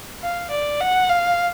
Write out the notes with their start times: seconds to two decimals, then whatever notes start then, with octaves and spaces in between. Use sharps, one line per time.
0.22 F5
0.50 D5
0.81 F#5
1.09 F5